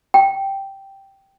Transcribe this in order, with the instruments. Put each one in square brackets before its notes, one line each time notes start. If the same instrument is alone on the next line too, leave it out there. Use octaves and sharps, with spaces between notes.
[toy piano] G5